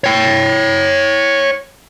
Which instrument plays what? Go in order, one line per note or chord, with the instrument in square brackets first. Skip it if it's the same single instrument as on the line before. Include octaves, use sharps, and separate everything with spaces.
[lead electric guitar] C#5 G5